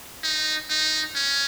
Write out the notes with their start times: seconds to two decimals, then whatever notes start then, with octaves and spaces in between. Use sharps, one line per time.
0.24 D#4
0.69 D#4
1.15 C#4